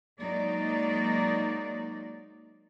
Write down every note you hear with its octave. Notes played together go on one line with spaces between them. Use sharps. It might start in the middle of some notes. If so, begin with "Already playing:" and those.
F#3 G#3 A#3 D#4 D5